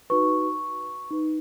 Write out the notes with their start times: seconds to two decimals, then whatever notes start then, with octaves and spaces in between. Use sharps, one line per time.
0.10 D#4 F#4 B4 C#6
1.10 D#4 B4